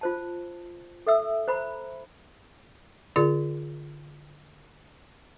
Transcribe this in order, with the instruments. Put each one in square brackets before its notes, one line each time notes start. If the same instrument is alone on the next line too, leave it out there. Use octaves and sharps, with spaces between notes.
[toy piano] F4 C5 A5
A4 E5 E6
C5 A#5 B5
[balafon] D3 F4 G#4 D5